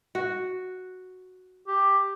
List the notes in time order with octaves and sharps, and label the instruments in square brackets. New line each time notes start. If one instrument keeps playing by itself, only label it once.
[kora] F#4
[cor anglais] G4